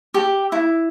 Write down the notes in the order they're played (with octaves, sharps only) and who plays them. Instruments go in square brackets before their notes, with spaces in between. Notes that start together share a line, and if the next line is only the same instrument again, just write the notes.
[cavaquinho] G4
E4